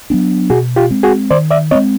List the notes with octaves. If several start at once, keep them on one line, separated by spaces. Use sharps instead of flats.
F#3 B3 D4
B2 F#4 G#4
F4 G4
G#3 C4
F#4 G#4
D#3 C5 D5
D5 E5
G#3 C4 C#5 D#5